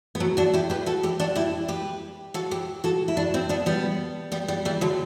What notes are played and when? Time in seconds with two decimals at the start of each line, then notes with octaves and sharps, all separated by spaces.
0.15 B3
0.20 F#3 A3
0.37 D4 F#4
0.53 E4 G4
0.70 G4 B4
0.86 F#4 A4
1.03 E4 G4
1.20 D4 F#4
1.35 E4 G4
1.68 G4 B4
2.34 F#4 A4
2.51 E4 G4
2.84 F#4 A4
3.08 E4
3.17 D4 F#4
3.34 C4 E4
3.49 B3 D4
3.66 G3 B3
4.32 G3 B3
4.48 G3 B3
4.65 E3 G3
4.81 D3 F#3